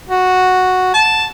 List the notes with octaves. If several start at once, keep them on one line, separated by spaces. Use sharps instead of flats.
F#4
A5